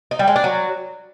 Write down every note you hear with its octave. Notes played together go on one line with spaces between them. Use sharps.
D#4
G3
G#3
D4
F#3